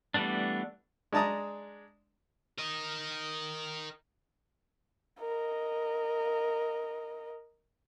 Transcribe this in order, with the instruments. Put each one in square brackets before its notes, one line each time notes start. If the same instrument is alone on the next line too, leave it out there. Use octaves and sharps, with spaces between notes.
[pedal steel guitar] E3 G3 A3 B3 D4
[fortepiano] G#3 D4 A5 A#5 D#6
[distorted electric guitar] A#4 D#5
[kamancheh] A#4 D#5